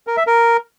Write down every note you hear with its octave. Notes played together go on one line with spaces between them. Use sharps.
A#4
E5
A#4